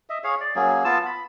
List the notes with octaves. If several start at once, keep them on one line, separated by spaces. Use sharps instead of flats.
D#5 E5
G#4 C#5 F5
D5
F#3 A#3 C#4 G#4
B3 F4 A5 E6
B5